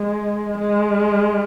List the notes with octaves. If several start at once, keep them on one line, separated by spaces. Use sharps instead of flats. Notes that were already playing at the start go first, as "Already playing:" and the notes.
Already playing: G#3
G#3